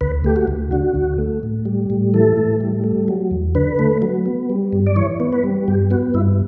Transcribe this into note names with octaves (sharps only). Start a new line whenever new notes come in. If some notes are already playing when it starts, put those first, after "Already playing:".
D2 B4
A3 G4
F#4
D2
D3 F#4
D2
A3
A2
G3
A2
E3 A4
A2
G3
A3
F#3
E2
D3 B4
A3
F#3
B3
G3
G2
D5
E3 C#5
B3
B4
G3
G2 G4
B3 F#4
G2 E4